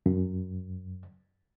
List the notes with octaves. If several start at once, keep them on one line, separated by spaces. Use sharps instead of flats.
F#2